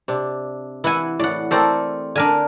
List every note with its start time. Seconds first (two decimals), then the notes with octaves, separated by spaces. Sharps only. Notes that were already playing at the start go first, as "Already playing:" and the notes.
0.08 C3 D4
0.84 E3 E4 F#5 G#5
1.20 A2 D5 F#5
1.51 A3 C4 A4 A#4 C5 D5
2.15 D3 D4 A#4 G#5